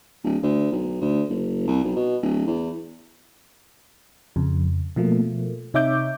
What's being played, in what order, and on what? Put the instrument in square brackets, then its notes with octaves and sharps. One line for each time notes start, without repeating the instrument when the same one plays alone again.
[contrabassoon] D1
D2
B1
D2
F#1
C2
B1
B2
D1
E2
[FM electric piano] F2 C#3
B2 F3 A3 A#3
C3 D#4 C#5 E5 D6 G6